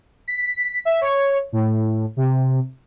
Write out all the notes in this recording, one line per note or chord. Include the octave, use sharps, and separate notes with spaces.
B6
E5
C#5
A2
C3